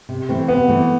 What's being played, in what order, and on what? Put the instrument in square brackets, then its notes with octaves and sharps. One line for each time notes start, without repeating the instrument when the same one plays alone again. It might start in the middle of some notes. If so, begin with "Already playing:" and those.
[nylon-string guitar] C3
E3 A3 C4
[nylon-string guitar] C3 [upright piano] B3
[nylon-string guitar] E3 A3 C4